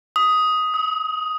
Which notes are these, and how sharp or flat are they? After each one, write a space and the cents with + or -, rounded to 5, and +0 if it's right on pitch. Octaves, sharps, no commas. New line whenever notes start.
D#6 +10
D#6 +40